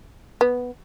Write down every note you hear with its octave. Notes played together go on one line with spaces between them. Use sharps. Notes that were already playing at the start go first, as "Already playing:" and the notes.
B3